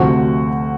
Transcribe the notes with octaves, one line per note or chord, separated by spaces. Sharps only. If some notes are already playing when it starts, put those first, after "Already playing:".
Already playing: D2 C3 F3 F#4